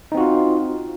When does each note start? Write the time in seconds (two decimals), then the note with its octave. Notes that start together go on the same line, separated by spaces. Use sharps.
0.12 D#4
0.15 C4
0.17 F#4
0.20 F4